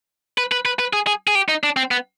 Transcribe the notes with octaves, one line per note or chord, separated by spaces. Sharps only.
B4
B4
B4
B4
G#4
G#4
G#4
G4
D#4
D4
C4
B3